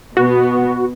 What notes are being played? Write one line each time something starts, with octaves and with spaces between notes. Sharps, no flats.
B2 B3 F#4